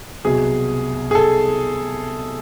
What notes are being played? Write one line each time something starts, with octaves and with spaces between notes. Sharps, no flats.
C2 B2 F#3 G#4
G#4
A4